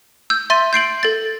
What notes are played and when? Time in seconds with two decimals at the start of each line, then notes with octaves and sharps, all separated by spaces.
0.30 E6 G6
0.50 E5 C6 A6 D#7
0.73 G6 C7 D7 F#7
1.03 A4 A6